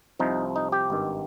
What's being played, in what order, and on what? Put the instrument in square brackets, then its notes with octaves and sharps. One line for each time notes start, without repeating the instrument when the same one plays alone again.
[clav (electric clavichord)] C2 C3 F3 D#4
D#4
G4
G#1 G2 D#3